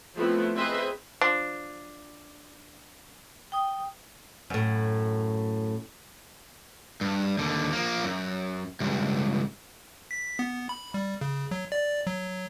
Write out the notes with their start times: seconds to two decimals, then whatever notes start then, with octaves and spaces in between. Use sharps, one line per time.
0.15 F3 A3 B3 C4 E4
0.55 C4 G#4 B4 C5 D#5 E5
1.21 F3 D4
3.52 G5 D#6
4.50 F#2 A2
7.01 G2
7.38 D#2 D3
7.73 F3 A#3
8.04 F#2
8.80 C#2 G2
10.11 B6
10.39 B3
10.69 B5
10.94 G3
11.21 C#3
11.51 F#3
11.72 D5
12.07 F#3